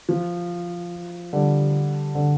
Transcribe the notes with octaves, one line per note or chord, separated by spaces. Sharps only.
F3
D3 G3
D3